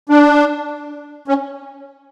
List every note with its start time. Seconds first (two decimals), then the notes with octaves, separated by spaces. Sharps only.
0.09 D4
1.28 C#4